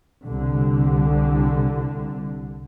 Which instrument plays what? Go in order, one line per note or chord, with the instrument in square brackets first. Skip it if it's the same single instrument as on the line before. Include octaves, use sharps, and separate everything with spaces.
[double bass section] C2 D3